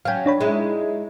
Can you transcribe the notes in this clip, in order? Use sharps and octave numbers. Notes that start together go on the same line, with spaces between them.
F#3 C#4 F5 G5
D4 C#5 B5
G#3 D#4 E4